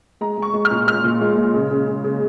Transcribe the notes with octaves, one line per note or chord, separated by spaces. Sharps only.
G#3 A#5
G#3 C#6
G#3
F6
A#2
G#3 F6
A#2
G#3
G#3
C#3
C#3
C#3
C#3